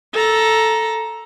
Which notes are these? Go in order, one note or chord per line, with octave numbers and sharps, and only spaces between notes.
A4 A#5